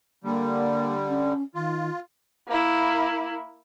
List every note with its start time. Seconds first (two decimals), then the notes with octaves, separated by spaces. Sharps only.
0.24 D3 G3 A#3
1.08 C#4
1.55 D#3 F4
2.48 A#3 E4